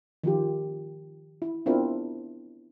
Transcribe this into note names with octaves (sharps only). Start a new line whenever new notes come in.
D#3 F3 F4 G4
E4
B3 C4 D4 E4 F4 A#4